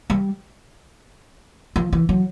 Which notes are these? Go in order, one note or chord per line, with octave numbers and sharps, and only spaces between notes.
G3
F3
E3
F#3